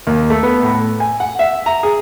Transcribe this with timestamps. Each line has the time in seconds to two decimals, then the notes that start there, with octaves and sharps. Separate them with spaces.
0.07 D#2
0.30 A3
0.43 B3
0.63 A2
1.00 G#5
1.20 F#5
1.39 E5
1.66 A#5
1.83 G#4